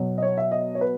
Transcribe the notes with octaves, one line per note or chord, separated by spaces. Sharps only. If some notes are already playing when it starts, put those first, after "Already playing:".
Already playing: B2 F#3
D#5
C#5
E5
D#5
C#5
B4